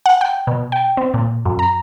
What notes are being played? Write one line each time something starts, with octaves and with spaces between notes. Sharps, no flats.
F#5
G5
B2
G5
C4
A#2
F#2
A#5